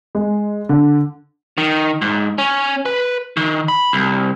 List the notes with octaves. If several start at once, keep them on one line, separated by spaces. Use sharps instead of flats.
G#3
D3
D#3
G#2
C#4
B4
D#3
B5
C2